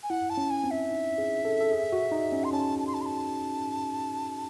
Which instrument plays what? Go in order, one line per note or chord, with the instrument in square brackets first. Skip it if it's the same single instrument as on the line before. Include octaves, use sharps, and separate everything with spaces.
[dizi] G#5
[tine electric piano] E4 [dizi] F#5
[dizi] A5
[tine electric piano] C#4
[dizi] G#5
[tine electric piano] C4
[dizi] E5
[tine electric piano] D#4
G#4
A4
A4
G#4
F#4
D#4
C#4
[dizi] C6
[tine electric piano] C#4 [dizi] A5
[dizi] A5
C6
A5
C6
A5